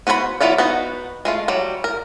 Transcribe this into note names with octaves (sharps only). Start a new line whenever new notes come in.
B3 F#4 C5 C#5 B5
F#3 B3 E4 F4 D5
B3 D#4 F#4
G#3 A3 F4
F#3 G3
A#4